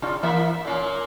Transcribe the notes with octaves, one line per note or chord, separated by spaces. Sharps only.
C3 D4 F4
E3 A#3 E5
A#2 A#3 C#4